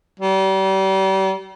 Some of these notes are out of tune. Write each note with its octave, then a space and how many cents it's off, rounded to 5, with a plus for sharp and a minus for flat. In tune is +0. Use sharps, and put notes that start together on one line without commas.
G3 -35